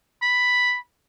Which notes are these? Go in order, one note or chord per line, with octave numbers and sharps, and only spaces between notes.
B5